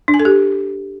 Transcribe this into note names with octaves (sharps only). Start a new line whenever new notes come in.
D4
G#5
A4
G4